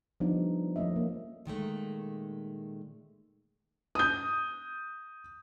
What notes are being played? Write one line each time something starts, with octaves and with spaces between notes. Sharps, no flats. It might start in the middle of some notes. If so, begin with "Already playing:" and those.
F3 G3 B3 D4 D#4
F3 A3 C#4 D#5 E5
A#3
A#2 D#3 G#3 A3
D#6 G6